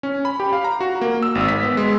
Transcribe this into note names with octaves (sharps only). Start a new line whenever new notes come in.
C#4
B5
G4
F5
A#5
F#4
A#3
E6
G#1
B6
B3
G#3